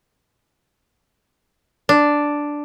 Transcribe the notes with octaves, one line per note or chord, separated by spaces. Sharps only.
D4